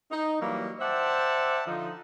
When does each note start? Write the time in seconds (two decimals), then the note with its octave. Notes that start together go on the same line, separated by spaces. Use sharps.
0.11 D#4
0.40 E3 F#3 G3 A#3
0.80 C5 D5 E5 F#5 G5 A5
1.67 D3 F3 D#4